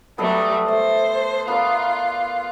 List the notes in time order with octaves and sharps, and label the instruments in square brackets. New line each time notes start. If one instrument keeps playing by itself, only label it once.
[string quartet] F#3 G3 A3 [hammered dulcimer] B3 A4 D#5
[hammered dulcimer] A3 [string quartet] C5
[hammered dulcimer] B3 A#4 D5 [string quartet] F4